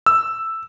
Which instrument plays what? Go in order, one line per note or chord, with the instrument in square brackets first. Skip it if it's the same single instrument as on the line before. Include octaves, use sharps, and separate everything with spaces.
[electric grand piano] E6